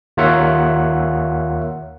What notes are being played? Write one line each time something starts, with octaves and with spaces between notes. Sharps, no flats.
D#2 F4 A#4 C#5 E5 F#5